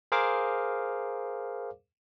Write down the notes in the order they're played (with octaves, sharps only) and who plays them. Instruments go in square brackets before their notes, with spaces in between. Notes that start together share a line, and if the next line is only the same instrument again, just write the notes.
[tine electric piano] G#4 A#4 C5 F5 D6